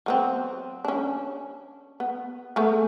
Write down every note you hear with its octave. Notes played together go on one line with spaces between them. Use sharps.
F#3 B3 C4
C#4 D4
B3
A3 B3 G#4